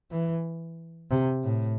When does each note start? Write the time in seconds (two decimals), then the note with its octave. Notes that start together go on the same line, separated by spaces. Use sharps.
0.11 E3
1.11 C3
1.44 A2